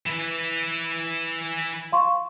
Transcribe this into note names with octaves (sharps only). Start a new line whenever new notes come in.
E3 B4
F5 C6 C#6